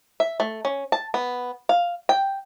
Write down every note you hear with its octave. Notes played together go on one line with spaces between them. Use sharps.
E5
A3
C#4
A5
B3
F5
G5